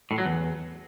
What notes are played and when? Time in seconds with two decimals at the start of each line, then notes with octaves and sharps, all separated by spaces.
0.11 A2
0.18 F#3
0.25 E2